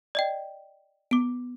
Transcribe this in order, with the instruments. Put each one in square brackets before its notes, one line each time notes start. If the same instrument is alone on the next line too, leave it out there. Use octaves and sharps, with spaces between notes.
[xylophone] D5 D#5 G5
[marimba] B3 [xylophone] D6 D7